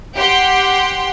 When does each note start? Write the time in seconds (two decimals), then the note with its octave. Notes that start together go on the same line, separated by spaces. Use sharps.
0.15 G4 F#5 G5 C6